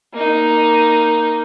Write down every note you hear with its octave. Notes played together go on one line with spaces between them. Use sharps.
A#3 D#4